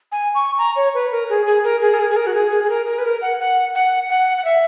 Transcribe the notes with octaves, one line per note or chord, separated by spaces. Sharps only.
G#5
C#6
A#5
C#5
B4
A#4
G#4
G#4
A#4
G#4
A#4
G#4
G#4
A#4
F#4
G#4
G#4
G#4
A#4
A#4
B4
A#4
F#5
F#5
F#5
F#5
F#5
E5